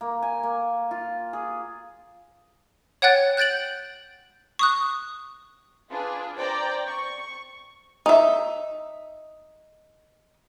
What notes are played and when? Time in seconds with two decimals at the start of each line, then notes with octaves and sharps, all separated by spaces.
0.01 A#3
0.22 G#5
0.43 A#3
0.91 F4
1.33 G#4
3.02 C#5 F#5 G5 F#6 A6
3.37 F#6 G6 A6 D7 F#7
4.59 C#6 D#6 F#6
5.91 D4 F4 G#4 B4
6.38 C5 D5 G5 A#5
6.87 C#6
8.06 D#4 E5